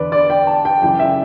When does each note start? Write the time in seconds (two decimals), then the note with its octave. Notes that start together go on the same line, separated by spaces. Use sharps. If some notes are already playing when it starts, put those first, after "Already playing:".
Already playing: E2 D3 B4 D5
0.12 D5
0.30 G5
0.47 A5
0.65 G5
0.82 F#2 C#3 E3 G5
0.99 E5